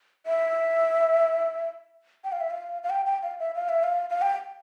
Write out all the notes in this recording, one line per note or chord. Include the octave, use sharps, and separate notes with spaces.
E5
G5
F5
E5
F5
F5
G5
G5
F5
E5
F5
E5
F5
F5
G5